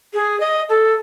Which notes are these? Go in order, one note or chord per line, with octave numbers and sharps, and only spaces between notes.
G#4
D#5
A4